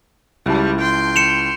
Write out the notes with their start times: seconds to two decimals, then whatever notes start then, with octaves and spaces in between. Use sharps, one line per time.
0.46 C#2 G3 E4 A5
0.81 G5 C6
1.16 C#7 E7 F7